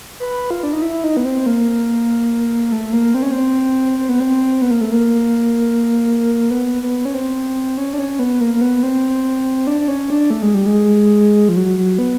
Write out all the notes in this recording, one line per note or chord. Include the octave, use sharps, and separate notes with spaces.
B4
F4
D4
D#4
E4
D#4
B3
C4
A#3
A3
A#3
C4
C#4
C4
C4
B3
C4
B3
A#3
A3
A#3
B3
B3
C#4
C4
C#4
D4
C#4
B3
A#3
A#3
B3
C4
D4
D4
C#4
D4
A3
G#3
G3
G#3
F3
F#3
F#3
B3